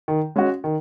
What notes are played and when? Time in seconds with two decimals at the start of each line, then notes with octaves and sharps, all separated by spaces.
0.08 D#3
0.36 G#3 C#4 F#4
0.64 D#3